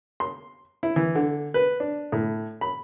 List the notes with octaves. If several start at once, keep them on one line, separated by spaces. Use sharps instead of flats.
C6
E4
E3
D3
B4
D4
A2
B5